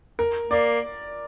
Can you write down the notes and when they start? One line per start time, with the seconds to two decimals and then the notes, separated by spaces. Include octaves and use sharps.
0.19 A#4
0.51 A#3 D5